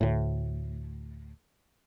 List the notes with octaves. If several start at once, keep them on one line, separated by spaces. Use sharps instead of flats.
D2 A2